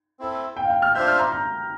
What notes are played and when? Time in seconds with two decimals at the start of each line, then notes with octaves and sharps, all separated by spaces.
0.19 C4 E4 A4
0.57 G5
0.65 F5
0.70 G5
0.82 F6
0.94 D4 F4 C5 E5 G6
1.07 F6
1.19 A#5
1.32 A#5